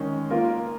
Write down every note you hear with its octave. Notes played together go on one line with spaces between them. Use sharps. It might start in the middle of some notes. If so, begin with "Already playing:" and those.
Already playing: D#3 G#3 C#4
A#3 F4 A#4